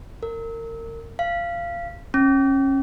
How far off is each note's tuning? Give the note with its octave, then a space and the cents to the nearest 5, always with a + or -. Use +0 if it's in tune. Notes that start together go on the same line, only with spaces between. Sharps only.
A#4 -30
F5 -20
C#4 -25